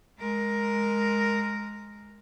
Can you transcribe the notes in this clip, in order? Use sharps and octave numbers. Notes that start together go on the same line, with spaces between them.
G#3 A#4